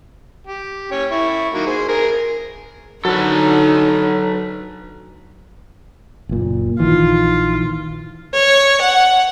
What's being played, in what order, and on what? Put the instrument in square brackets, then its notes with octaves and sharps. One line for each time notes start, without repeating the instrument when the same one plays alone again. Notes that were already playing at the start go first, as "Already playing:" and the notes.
[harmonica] G4
C#4 C#5 G5
E4 C#6
D#3 F#3 A#3
G#4 C5
G#4 A#4
[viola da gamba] D3 D#4 [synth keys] F#3 [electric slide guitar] A4 B4
[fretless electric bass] F#1 A#2
[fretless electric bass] A#1 D#3 E3 [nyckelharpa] F4
[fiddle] C#5
F#5